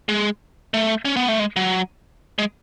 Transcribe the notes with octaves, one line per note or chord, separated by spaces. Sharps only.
G#3
A3
C#4
B3
A3
G#3
F#3
G#3